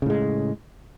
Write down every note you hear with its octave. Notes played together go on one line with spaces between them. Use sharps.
A2 C#3 G#3